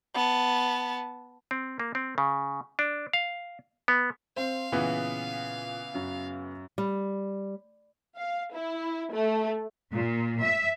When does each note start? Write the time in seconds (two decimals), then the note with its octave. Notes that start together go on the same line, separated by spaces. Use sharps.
0.14 B3 A5
1.51 C4
1.80 A#3
1.95 C4
2.18 C#3
2.79 D4
3.13 F5
3.88 B3
4.37 C4 C5 F5
4.72 A#2 C#3 E3 B3
5.94 F#2
6.78 G3
8.16 F5
8.53 E4
9.12 A3
9.93 A#2
10.43 E5